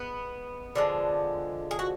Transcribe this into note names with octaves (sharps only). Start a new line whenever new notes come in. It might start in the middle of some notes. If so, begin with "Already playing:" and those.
Already playing: G#3 B3
D3 F3 G#3
G#4
F#4